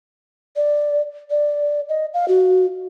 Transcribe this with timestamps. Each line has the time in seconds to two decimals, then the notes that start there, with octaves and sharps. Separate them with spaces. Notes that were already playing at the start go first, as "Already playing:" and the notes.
0.56 D5
1.30 D5
1.89 D#5
2.14 F5
2.28 F#4